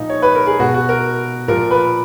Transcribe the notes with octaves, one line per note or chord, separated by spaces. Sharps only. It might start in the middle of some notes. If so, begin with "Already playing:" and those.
Already playing: A#2 F3 D#4
C#5
B4
A#4
G#4
B2 F#4
F#4
A#4
A#2 F3 A#4
B4